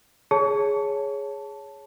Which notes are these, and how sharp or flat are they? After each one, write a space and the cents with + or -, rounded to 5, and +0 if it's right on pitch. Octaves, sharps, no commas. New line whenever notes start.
G#4 +0 C#5 +0 A5 +0